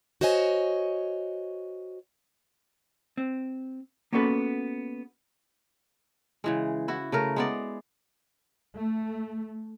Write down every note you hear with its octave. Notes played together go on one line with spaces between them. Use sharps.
F#4 C5 C#5 D#5 G#5
C4
A#3 B3 C#4 F#4 A4 B4
C#3 E3 G#3
E4 F#4
C#3 A3 A#4
G#3 B3 D5
A3